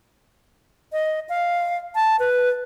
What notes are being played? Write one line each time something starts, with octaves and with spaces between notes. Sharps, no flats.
D#5
F5
A5
B4